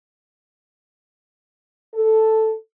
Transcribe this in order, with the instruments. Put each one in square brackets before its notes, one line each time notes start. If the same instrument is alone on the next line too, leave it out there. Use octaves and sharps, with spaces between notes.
[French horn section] A4